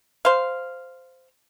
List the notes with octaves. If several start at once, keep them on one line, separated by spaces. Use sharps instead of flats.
C5 F5